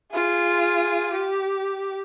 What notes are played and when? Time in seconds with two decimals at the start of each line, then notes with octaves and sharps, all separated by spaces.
0.13 F4 G#4
1.13 G4